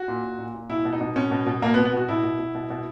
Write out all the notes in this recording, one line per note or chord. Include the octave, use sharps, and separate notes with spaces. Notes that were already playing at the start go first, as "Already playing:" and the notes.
Already playing: F#4
A#2
A#2
A#2
A#2
B2 E4
B2
D#4
B2
B2 C#4
B2
B2
B2 A#3
B3
B2
B3
B2 F#4
B2 E4
B2
B2
B2
B2